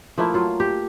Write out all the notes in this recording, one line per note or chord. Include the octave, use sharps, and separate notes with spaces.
F3 A3 A#3 E4
F#3 F4
G4